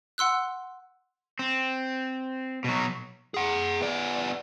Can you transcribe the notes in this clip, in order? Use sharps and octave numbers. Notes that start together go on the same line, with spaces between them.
F#5 C6 E6 F#6
C4
B2 F#3
G#4 F#5
B3 D5